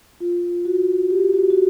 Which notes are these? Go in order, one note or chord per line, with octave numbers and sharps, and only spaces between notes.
F4
F#4
G4
F#4
F#4